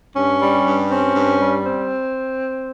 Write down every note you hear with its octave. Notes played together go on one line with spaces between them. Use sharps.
G2 C#4
G3
G2
C4 C#4
G2
G3
C4